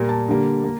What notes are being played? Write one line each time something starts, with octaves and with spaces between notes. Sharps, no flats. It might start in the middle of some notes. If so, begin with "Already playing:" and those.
Already playing: A#2 G3 A#3
A5
D3 G3 A#3
A#3